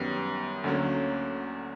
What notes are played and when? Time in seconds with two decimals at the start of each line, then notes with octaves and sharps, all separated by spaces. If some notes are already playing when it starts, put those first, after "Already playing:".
Already playing: F#2 D#3 G3 B3
0.64 D2 D3 F#3 A#3 C#4